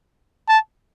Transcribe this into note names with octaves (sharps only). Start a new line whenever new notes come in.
A5